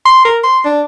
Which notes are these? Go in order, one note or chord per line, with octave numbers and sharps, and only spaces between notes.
C6
A#4
C6
D4